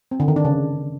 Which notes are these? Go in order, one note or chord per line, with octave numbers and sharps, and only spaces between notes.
C4
D3
D#3
D4
C#3